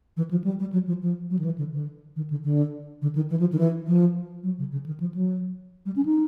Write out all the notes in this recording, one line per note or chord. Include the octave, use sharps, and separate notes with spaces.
E3
F3
G3
G3
F#3
F3
F3
F#3
D#3
E3
D3
D3
D#3
D3
D3
D3
D#3
E3
F3
D#3
E3
F3
F#3
C#3
C#3
D#3
F3
F#3
G3
C#4
D#4